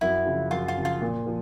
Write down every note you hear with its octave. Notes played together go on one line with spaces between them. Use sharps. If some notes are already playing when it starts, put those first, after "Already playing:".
F#2 E4
C#3 F3
F#2 F4
F4
C#3 F3
F4
A#2
F3